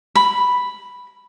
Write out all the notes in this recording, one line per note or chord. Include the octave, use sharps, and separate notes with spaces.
B5